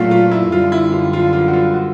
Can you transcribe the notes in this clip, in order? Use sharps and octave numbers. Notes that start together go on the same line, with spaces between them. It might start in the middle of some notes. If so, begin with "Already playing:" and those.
Already playing: A#2 F#3 A3 F4 F#4
F4
E4
F#2 D3 G3 F4
E4
F4
F4
F4
F#4
F4
F#4